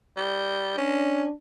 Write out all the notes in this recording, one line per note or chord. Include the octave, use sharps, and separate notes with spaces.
G3
C#4 D4